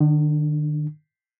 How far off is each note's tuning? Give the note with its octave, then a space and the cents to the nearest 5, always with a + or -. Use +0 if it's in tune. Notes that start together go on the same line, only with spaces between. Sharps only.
D#3 -45 D4 +0